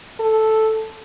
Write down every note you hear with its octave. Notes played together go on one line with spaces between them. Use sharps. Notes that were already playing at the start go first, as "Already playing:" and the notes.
A4